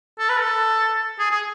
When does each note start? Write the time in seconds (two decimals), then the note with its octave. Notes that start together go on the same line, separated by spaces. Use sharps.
0.19 A4
0.29 B4
0.40 A4
1.19 G#4
1.31 G#4